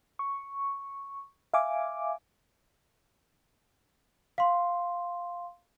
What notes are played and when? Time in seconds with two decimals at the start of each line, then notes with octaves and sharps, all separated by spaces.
0.19 C#6
1.54 E5 F5 G#5 D6
4.38 F5 C6